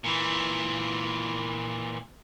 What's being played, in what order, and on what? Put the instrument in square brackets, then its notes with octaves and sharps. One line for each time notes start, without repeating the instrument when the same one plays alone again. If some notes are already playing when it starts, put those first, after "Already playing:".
[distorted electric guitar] A#2 E3